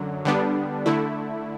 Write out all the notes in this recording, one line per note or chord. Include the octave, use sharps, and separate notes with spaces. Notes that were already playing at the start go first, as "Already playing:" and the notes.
Already playing: F#2 D3 F#3
D3 G3 B3 D4
D3 A3 E4